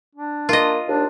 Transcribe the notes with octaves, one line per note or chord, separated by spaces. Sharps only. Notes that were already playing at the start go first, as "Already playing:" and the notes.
D4
A#3 F4 D#5
D#2 D4